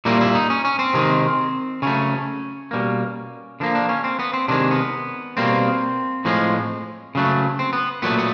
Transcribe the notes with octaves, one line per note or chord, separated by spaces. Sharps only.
A#2 G3 A#3 E4
E4
D#4
C#4
C#4
C4
C3 D#3 G#3
C#3 F#3 A3 C#4
B2 G3 A#3
D3 F3 A#3 D4
D4
C#4
C4
B3
C4
C3 D#3 G#3 D4
B3
B2 G3 A#3 C4
A2 F3 G#3
C#3 F#3 A3
C4
B3
A#2 F#3 A3 B3
B3